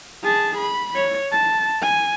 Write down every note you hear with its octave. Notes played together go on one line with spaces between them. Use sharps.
G#4 A5
B5
C#5
A5
G#5